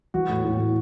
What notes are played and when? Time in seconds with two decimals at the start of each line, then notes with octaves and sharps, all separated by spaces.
0.14 E3 F#4
0.29 A2
0.45 A2
0.59 A2